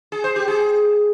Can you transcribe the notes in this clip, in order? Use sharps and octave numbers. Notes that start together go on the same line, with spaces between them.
G#4
C5
G4
G#4